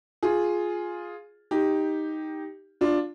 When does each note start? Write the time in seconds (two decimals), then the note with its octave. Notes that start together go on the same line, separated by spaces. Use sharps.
0.23 F4 G#4
1.51 D#4 G4
2.81 D4 F4